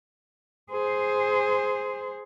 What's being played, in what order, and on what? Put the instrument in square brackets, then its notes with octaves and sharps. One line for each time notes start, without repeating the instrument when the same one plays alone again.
[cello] G#4 C5